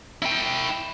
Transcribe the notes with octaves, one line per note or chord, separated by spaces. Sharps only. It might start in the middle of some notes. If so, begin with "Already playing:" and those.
E4 G5